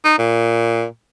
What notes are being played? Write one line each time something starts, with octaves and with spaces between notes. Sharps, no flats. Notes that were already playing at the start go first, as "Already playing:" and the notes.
D#4
A#2